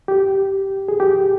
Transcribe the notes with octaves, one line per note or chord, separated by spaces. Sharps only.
G4
G#4
G4